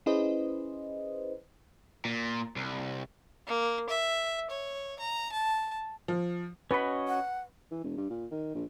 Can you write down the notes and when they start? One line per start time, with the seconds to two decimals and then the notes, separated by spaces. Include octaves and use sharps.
0.06 C#4 E4 G#4 B4 C5 D#5
2.05 A#2
2.56 C2
3.47 A#3
3.89 E5
4.50 C#5
4.99 A#5
5.32 A5
6.08 F3
6.71 C#4 F#4 B4 D#5 B5
7.08 F#5
7.71 E3
7.84 E1
7.97 G2
8.10 A#2
8.31 D#3
8.55 A#1